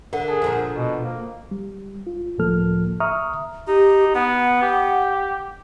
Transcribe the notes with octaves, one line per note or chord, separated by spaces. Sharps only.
D3 A#4 F#5
G#4 A5
A#2 D3 F3
B2
A#3
G3
F4
C#2 A2 F3 A#3 A4 F6
E5 A#5 C#6 D#6 F6
D#4 G4
B3 F#5
G4